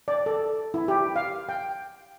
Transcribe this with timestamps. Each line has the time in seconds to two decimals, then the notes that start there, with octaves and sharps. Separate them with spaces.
0.08 D5
0.26 A4
0.74 E4
0.88 G4
1.16 F5
1.49 G5